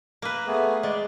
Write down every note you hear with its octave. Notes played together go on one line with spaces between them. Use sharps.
A#3 B4
A3 B3 G#4
G#3 D5